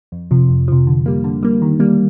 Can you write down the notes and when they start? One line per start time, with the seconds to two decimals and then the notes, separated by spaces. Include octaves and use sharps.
0.12 F2
0.31 C3 F3
0.49 F2
0.68 C3 F3
0.87 D3
1.06 G3 A#3
1.24 D3
1.43 G3 A#3
1.62 D#3
1.80 G3 A#3